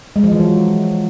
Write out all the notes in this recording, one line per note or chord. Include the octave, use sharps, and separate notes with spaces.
G#3
F3
E3
F#3